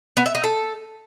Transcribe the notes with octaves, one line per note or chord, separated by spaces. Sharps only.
B3
E5
D#4
A4